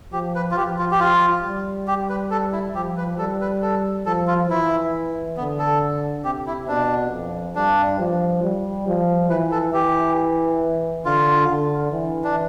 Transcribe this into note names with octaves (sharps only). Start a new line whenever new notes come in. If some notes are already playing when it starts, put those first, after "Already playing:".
F3 G4
B4
F4
F3 G4
F4
G4
F4
G3
G4
B4
A4
E4
F3 G4
B4
G3 A4
B4
A4
F3 A4
F4
E3 E4
D3 B3
A4
C3 G4
E4
B2 D4
F2
G2 D4
F3
G3
F3
E3 B4
A4
E3 G4
D3 F4
D3
E3
D4